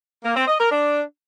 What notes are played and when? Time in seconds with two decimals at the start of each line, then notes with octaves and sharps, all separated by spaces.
0.24 A#3
0.36 C4
0.48 D#5
0.59 A#4
0.71 D4